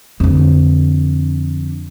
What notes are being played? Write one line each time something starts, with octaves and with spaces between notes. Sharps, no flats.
F2 D3